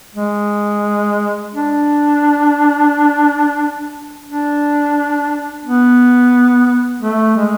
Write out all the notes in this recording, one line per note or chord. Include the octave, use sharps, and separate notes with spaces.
G#3
D4
D4
B3
A3
G#3